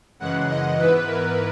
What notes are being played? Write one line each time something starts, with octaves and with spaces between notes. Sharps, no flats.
F#2 C#3 E3 G#3 F#5
D#5
G#2 E3 B3 E4 B4
A#4